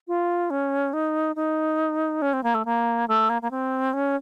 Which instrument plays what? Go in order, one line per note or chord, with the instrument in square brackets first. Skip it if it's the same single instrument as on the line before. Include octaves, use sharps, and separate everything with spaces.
[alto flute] F4
C#4
D#4
D#4
C#4
C4
A#3
A3
A#3
A3
A#3
A#3
C4
C#4